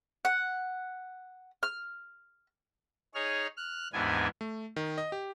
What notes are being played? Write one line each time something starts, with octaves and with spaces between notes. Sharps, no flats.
F#5
F6
D#4 G#4 C#5 F6
F6 F#6
D#2 G#2 E3 B3 D4 G#5
A3
D#3
D#5
G4